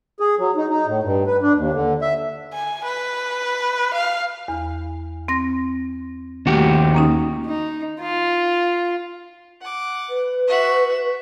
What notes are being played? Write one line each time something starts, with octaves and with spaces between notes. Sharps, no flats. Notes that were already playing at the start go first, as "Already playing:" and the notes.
G#4
F#3
D#4
D#4
A2
G2
B4
D4
D#2
D3
E5
G#5
B4
F5
E2
C4 A#6
D#2 A3 F#4 G4
A#3 C#4 D#4
D#4
F4
F#5 D6
B4
F#4 E5